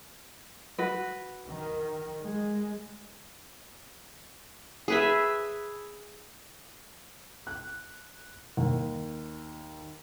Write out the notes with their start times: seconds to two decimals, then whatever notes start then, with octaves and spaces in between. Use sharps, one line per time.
0.78 F#4 B4
1.46 D#3
2.23 G#3
4.88 G#4 B4 E5
7.47 F#6
8.57 D#2